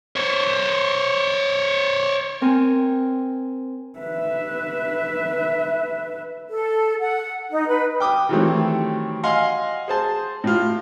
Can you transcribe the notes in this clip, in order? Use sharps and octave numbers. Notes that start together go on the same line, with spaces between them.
C5 C#5
C4 A#4 G#5
B4 E5
A4
F#5
D#4
B4
G5 D6 D#6
D#3 E3 F#3 G3 A3 C4
D#5 F5 F#5 G#5 C6
G#4 C5 A5
A2 F4